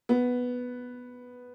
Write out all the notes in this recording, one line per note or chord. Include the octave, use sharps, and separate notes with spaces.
B3